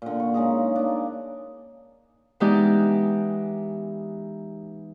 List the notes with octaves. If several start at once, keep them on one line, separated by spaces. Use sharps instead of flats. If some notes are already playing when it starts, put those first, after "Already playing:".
A#2 D3
C#6
C#3 G#3 D#4 G#4
A#3 D4
E3 G#3 B3 D#4 G4 D5